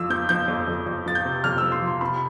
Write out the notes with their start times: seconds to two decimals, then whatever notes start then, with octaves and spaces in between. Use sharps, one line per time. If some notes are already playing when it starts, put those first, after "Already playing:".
Already playing: F2 F3 E6
0.10 F3 G6
0.29 F3 G6
0.48 F2
0.68 F2
0.86 F2
1.06 F3 A6
1.15 G6
1.25 C3
1.44 F2 F6
1.58 F3 E6
1.72 C6
1.82 F3
1.87 C6
2.01 C3 B5